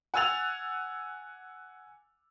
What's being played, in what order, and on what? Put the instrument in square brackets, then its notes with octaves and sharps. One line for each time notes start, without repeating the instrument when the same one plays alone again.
[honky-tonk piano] F#5 G#5 E6 A6 F7